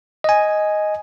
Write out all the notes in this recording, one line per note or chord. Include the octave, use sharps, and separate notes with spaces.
D#5 G#5